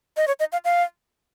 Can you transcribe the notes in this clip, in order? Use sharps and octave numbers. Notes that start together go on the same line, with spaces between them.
D#5
C#5
D#5
F5
F5